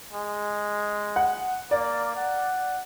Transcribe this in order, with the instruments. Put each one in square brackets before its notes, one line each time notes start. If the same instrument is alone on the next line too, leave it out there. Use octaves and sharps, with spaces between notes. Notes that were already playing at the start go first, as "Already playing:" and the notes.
[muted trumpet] G#3
[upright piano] F#5
[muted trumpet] A#3 [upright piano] D5
[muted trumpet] F#5